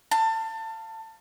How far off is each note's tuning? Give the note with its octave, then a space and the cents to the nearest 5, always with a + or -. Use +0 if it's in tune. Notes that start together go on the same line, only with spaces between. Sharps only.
F5 -15 A5 +25